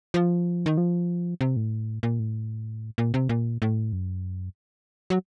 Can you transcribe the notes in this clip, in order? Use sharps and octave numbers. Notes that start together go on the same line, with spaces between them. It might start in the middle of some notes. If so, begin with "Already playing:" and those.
F3
D#3
F3
C3
A2
A#2
A2
A#2
C3
A#2
A2
F#2
F#3